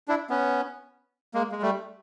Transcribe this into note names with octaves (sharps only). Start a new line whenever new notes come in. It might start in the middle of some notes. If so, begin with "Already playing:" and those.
D4 E4
B3 C#4
G#3 A#3
G#3
G3 A3